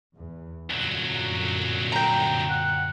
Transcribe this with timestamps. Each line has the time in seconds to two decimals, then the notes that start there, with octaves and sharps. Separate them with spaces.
0.14 E2
0.70 C2 F#2 A#2 D3 F#3
1.92 G5 A#5
2.50 F#5